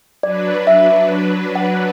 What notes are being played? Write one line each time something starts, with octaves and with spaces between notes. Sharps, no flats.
F#3 D4 B4 D5
E5
F#5